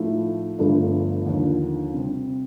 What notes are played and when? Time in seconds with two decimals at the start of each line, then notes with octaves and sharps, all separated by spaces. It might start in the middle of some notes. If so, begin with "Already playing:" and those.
Already playing: A2 F3 A3 D#4
0.58 G1 G2 F3 A3
1.26 D#2 D3 F3
1.94 C3 G3 C4